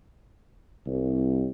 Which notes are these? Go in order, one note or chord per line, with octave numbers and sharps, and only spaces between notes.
C2